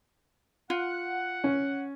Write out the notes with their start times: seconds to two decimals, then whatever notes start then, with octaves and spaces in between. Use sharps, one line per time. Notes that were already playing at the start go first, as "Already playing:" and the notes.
0.70 F4 F#5
1.44 C#4